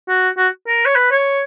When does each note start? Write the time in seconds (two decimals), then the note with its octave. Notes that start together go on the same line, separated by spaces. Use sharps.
0.09 F#4
0.38 F#4
0.67 A#4
0.86 C#5
0.96 B4
1.11 C#5